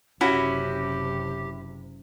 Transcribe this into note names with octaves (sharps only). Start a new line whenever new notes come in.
F#1 C3 C#4 E4 F#4 G4 F#5